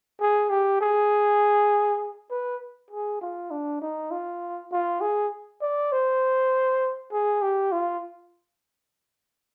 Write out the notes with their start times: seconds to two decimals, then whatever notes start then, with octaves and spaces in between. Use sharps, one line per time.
0.21 G#4
0.50 G4
0.81 G#4
2.31 B4
2.91 G#4
3.22 F4
3.51 D4
3.82 D#4
4.11 F4
4.72 F4
5.01 G#4
5.62 D5
5.92 C5
7.12 G#4
7.42 G4
7.72 F4